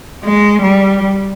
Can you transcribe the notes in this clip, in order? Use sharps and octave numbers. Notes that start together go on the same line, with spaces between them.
G#3
G3